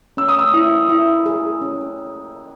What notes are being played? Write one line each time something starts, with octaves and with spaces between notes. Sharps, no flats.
C#4 E6
D#6
E6
E4
E4
G#4
C#4